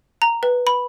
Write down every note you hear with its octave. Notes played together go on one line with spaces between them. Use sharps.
A#5
B4
B5